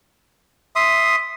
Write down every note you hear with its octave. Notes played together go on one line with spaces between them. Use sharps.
E5 C6 D#6